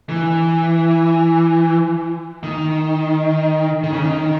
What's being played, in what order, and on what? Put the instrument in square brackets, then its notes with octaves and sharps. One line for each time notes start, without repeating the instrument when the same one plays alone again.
[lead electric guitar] E3
D#3
D#3
C#3
D#3